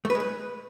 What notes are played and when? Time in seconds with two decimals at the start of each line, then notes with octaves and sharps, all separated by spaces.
0.05 A3
0.10 B4
0.15 G#3
0.20 B4